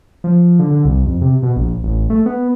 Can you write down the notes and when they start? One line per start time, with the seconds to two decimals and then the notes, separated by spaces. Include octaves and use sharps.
0.24 F3
0.59 D3
0.71 D3
0.85 C2
1.06 F2
1.21 C3
1.43 B2
1.56 A#1
1.83 A1
2.10 A3
2.26 B3